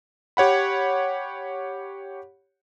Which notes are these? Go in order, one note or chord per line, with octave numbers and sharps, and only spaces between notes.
G4 C#5 F#5 B5